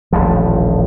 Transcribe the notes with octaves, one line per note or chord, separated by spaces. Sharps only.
D#1 A1 G2 F3